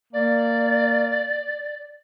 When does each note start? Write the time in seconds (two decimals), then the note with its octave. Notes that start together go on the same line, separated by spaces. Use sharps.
0.13 A#3 D5